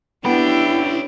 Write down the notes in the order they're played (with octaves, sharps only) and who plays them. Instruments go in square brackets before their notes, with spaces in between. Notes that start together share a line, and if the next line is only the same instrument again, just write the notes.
[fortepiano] B3 [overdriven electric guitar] C#4 G5 [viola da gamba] D4 G4 [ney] E4